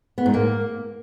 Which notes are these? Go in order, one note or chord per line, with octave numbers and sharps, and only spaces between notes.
B3
G#2
A#3